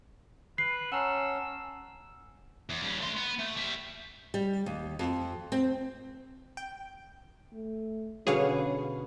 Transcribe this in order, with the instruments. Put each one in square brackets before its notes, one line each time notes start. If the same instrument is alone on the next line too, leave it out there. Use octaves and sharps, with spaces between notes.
[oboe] B4 [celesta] C7
[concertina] C#4 [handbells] F#5 A5 A#5 [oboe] E6
[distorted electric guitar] E2
G2 C#4
A3 C6
B3
A3
G3 E5
[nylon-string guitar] G3
D#2
F2
C4
[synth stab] G5
[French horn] A3
[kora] B2 D3 B3 [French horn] C#4 [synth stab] G#4 C#5 F5